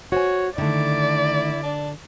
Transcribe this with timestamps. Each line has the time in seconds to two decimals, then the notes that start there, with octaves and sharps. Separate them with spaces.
0.12 F#4 C5 C#5 G#5
0.58 D3 D#3 A3 E4 D5
1.63 D4